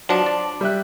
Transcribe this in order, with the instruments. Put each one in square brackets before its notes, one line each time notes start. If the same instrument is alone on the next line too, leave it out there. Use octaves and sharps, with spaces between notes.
[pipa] F3 D4 [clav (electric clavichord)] F#3
[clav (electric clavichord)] D5
[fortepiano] G3 E5 F#6